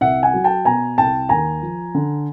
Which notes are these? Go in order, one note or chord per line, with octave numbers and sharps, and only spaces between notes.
C2 E5 F#5
F#5 G#5
F#3
G5 A5
B2 G#5 A#5
C2 G5 A5
D#2 G#5 A#5
F3
D3